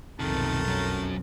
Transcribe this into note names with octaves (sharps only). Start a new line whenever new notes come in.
B1 F2 C3 D#3 A3 A#4 A5
F#3 C#4